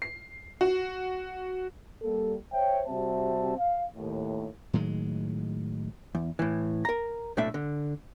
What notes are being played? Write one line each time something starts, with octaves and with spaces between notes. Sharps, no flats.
C7
F#4
G3 A#3 A4
C5 C#5 E5 G5
C3 G3 C4 F#4 E5 A5
F5
D#2 A2
A2 D#3 F#3 G#3
E2
A2 E3
A#4 A#5
B1 A2 A3 D4 E5
D3